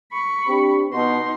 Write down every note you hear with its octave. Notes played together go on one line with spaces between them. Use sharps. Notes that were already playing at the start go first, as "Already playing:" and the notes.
B5 C#6
C4 D4 G4
B2 D#4 C6